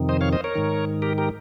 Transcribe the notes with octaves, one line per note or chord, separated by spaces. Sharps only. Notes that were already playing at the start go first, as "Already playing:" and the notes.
Already playing: F2 C3 D#3
C5 D#5
C#5 F5
C5 D#5
A#4 C#5
G#2 D#3
G4 A#4
G4 A#4